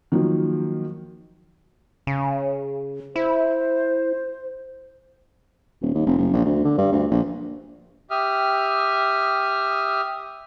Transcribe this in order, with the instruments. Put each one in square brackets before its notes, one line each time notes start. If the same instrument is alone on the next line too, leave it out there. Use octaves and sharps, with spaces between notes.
[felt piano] D#3 F3 F#3 A#3
[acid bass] C#3
[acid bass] E4 [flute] C5
[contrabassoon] D#1
D#2
F1
F#1
A#1
D2
D3
G2
D2
A#1
[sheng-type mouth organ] G4 E5 D#6 F6